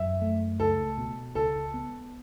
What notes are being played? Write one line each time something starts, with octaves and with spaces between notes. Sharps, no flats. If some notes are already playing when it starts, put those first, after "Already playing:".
Already playing: F#2 E5
A3
C#2 A4
B2
C#2 A4
B3